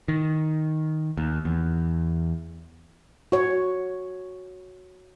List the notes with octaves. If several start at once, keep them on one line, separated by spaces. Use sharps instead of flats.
D#3
D#2
E2
F#4 C#5